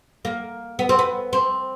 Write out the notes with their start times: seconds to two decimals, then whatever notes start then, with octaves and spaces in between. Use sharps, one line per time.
0.25 A#3
0.79 B3
0.89 C4
0.99 B3
1.33 C4